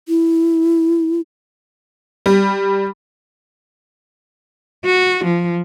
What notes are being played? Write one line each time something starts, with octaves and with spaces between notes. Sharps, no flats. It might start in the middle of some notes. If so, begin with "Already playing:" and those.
E4
G3
F#4
F3